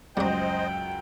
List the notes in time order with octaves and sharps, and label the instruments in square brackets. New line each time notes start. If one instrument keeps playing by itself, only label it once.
[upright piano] C#2 F#2 F#5 [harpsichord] F#3 G3 [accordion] C5 D#5 [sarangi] G5